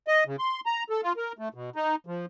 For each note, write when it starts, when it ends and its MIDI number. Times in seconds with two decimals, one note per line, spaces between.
0.08 0.24 75
0.26 0.36 49
0.39 0.60 84
0.66 0.83 82
0.90 1.01 69
1.03 1.13 65
1.17 1.32 70
1.38 1.49 57
1.54 1.70 47
1.76 1.96 63
2.06 2.26 53